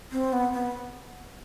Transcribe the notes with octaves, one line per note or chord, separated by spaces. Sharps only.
C4
B3
B3